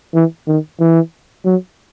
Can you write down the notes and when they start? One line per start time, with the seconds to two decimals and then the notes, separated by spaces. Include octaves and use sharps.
0.14 E3
0.47 D#3
0.80 E3
1.46 F#3